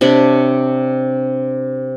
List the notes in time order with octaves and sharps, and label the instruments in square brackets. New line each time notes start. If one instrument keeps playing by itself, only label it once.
[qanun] C3 D4 C#5 B5